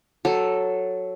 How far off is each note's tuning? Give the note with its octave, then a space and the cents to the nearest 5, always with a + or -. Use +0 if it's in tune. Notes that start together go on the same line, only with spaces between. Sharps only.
F#3 +0 A4 +0